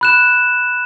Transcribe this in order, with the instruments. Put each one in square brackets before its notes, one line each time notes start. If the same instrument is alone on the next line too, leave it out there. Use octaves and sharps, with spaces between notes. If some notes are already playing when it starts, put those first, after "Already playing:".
[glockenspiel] B5 F#6 E7